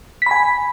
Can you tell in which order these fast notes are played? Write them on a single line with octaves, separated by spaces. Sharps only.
B6 B5 G#5